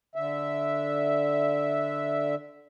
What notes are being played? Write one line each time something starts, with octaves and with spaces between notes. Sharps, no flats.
D3 E5